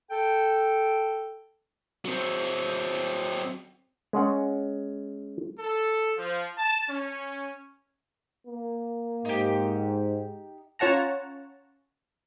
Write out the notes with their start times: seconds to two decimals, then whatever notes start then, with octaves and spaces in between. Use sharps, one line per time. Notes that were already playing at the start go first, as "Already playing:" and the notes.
0.11 A4 G5
2.05 F#3 C4
4.13 G#3 C#4 F#5
5.59 A4
6.17 F3
6.58 A5
6.89 C#4
8.47 A#3
9.25 G#2 D#4 G4
10.79 C#4 F4 C#5 F#5 A5 A#5